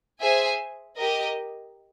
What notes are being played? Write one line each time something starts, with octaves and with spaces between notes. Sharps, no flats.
G#4 C5 E5 G#5
G4 A#4 D#5